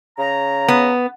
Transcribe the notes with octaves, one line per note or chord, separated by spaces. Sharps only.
C#3 A#5
B3